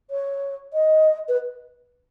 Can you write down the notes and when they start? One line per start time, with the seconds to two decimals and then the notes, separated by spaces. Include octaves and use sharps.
0.10 C#5
0.73 D#5
1.28 B4